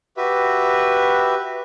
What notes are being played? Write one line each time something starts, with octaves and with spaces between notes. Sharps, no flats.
F#4 G4 B4 E5